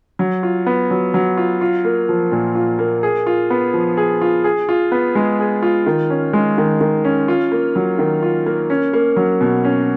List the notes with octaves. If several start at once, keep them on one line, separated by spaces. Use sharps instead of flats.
F#3
F4
B3
F#3
F#3
F4
F4
A#3
F3
A#2
F4
A#3
G#4
F4
B3
F3
G#4
F4
G#4
F4
B3
G#3
G#4
F4
D#3
C#4
G#3
D#3
D#3
C#4
F4
A#3
F#3
D#3
F4
A#3
C#4
A#3
F#3
B2
C#4